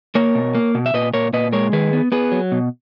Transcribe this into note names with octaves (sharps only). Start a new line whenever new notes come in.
A#3 A#4 C#5
B2
A#3
B2
E5
A#2 B4 D#5
A#2 A#4 C#5
A#2 B4 D#5
G#3 A#4 C#5
D#3 G#4 B4
B3
B3 G#4 B4
F#3
B2